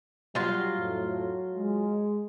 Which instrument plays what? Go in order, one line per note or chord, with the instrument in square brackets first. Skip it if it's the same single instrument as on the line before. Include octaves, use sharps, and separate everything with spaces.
[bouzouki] F#3 F4 [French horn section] G3
[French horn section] F2 A2 A3
G#3